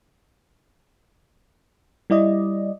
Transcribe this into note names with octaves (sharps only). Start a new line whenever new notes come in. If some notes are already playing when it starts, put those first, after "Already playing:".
G3 E4 D5 D#5